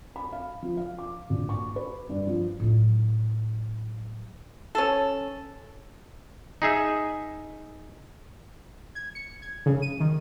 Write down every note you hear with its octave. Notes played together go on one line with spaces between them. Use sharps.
B5
F5
F3
F5
D6
A#1
C#6
B4
G2
F3
A2 F#3
C#4 A4
D#4 G#4 E5
G#6
C#7
G#6
C#3
D#7
D#3